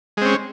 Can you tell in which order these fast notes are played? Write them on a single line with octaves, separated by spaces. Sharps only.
G#3 C4 C#4